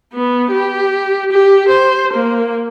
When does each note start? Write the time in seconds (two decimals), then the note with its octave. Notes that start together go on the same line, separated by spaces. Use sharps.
0.13 B3
0.51 G4
1.32 G4
1.69 C5
2.14 A#3